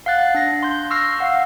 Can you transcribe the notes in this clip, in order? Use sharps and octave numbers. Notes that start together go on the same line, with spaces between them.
F5 F#5 F#6 A6
D4 A#6
C6 G6
C#6 E6 F6 A#6 C7
F5 F#5 E6